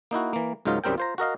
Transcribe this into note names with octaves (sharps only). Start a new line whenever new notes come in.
A#3 D#4 E4 F#4
E3 A#3
C#2 G#2 F#3 D#4 F4 A#4
C2 F#2 G3 C4 A#4 G5
F4 C5 A#5
F#4 A#4 D#5 F5